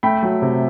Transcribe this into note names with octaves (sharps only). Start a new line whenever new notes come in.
A3 G5 B5
F#3
C3